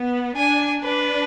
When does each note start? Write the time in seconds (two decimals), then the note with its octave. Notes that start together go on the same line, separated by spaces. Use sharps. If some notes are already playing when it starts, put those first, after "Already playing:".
Already playing: B3
0.37 D4 G#5
0.83 D4 B4